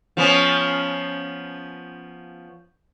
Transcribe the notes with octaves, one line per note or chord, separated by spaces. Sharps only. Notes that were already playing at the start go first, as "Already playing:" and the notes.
F3 B3 C#4